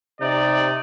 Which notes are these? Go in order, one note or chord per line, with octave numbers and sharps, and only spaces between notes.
C3 D#4 D5